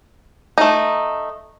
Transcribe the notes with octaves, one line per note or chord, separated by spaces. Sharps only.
A3 D#4